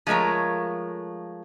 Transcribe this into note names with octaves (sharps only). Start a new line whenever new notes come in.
F3 G#3 A3 A#4 C#5